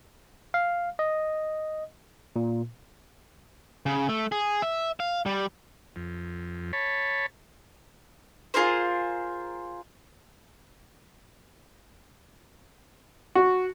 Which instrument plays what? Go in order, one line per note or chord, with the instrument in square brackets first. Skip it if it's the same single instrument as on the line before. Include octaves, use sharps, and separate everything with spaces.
[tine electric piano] F5
D#5
A#2
[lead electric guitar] C#3
A3
G#4
E5
F5
G3
[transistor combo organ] F2
C#5 A5 B5
[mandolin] F4 G#4 A#4 C5
[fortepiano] F#4